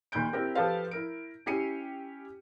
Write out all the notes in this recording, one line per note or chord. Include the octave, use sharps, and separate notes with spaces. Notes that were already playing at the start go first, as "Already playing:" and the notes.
D#2 A#2 B5 F#6 G6 D7
C4 E4 G4 A#4
F3 G4 A4 B4 C5 F5
E4 A#4 D7
C#4 E4 G4 C7 C#7 D#7